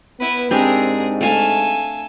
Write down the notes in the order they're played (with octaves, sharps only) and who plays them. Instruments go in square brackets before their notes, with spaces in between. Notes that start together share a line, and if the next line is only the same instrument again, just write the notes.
[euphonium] B3 [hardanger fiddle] E4 B4
[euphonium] G#2 [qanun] C4 D4 G4 [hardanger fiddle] G#4 A#4
[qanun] A3 F5 [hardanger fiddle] A4 G#5